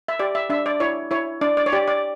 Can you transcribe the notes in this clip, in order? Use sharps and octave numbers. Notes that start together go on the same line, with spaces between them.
E5
G4 D5
E5
D4 E5
D5
E4 C#5
E4 C#5
D4 D5
D5
C#5
G4 D5
D5